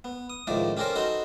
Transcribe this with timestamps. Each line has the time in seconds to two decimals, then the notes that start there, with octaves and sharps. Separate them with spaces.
0.04 B3
0.30 D#6
0.47 C#2 A2 D#3 F3 D5
0.77 C#4 G4 A4 A#4 C5 D5
0.96 D#4 F#4 A4 B4 C5 C6